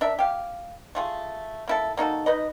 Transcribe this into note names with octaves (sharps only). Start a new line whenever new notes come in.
D4 A#4 E5
G4 F5
A3 F4 G#4
A#3 E4 A4
A#3 D#4 F#4 A4
D#4 B4 D#5